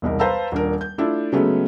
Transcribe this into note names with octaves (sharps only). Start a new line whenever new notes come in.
E1 C2 D#4 A#4
B4 C5 F5 A5 A#5 E6
D#1 D4 A#4
G6
A3 D4 E4 F4 A4
C#3 F#3 G#3 A3 B3 C#4